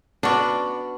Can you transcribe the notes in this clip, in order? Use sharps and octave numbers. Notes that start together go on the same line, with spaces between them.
B3 C#4 D4 F#4 D5